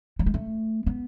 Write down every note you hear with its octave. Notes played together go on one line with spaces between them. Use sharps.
F#3
G#3
A3
B3